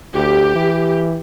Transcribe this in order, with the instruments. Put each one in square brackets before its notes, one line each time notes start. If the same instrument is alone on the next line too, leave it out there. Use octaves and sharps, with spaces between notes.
[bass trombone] D2 [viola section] G4
[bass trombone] E3